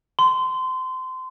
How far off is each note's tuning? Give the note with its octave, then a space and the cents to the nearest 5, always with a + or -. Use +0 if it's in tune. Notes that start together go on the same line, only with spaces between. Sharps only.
C6 -25